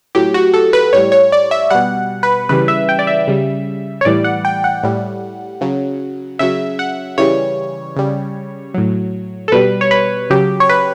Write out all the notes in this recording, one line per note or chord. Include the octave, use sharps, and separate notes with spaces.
A2 F#3 G4
F#4
A4
B4
A2 G3 C#5
C#5
D5
E5
B2 G3 F#5
B4
C#3 E3 G3 B4
E5
G5
D5
E5
C#3 G3
C#5
A2 E3 G3 D5
F#5
G5
F#5
A2 G3
C#3 F#3
C#3 F#3 E5
F#5
C#3 E3 G3 C#5
C#3 G3
A2 F#3
A4
B2 G3 B4
C#5
B4
C#3 F#3 G4
C#5
B4